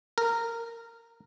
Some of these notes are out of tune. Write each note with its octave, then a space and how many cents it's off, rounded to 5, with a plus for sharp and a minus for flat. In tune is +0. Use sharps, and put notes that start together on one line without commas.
A#4 -15